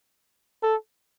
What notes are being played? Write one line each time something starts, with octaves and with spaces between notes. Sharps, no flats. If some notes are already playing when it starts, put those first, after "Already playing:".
A4